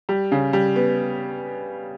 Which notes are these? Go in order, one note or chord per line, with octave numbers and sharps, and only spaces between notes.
G3
C#3
G3
B3